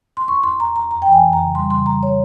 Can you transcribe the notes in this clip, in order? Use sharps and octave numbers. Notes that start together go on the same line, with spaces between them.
C6
E2 C#6
E2 C6
E2 A#5
E2 A#5
F2 A#5
G5
E3
G#5
F2
A#5
C#3
G3 C6
C#3 C6
G3 A#5
C#5